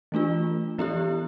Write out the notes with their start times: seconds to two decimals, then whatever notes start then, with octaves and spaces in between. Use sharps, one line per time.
0.12 E3 A3 D4 F4
0.79 E3 B3 E4 G4